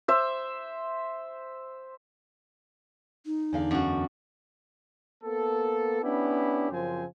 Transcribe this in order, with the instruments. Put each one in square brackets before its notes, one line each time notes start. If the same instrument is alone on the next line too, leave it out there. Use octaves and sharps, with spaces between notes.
[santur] C5 E5
[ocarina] D#4
[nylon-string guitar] E2 D3 F5
[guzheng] F#2 F#4
[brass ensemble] A#3 B3 A4
B3 C#4 D4 E4 G4
F#2 C#3 F3 C4 G#5